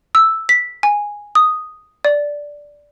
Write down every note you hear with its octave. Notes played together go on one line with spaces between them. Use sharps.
E6
B6
G#5
D#6
D5